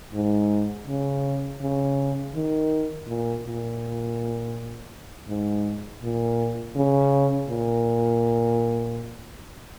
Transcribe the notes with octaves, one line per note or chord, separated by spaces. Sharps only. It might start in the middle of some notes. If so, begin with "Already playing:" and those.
G#2
C#3
C#3
D#3
A#2
A#2
G#2
A#2
C#3
A#2